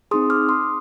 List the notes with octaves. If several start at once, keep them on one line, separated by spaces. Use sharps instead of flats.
C4 D#4 G#4 C6 D#6
D6 F6
C6 D#6